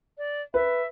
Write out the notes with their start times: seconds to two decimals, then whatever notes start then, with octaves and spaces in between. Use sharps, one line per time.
0.18 D5
0.54 B4 E5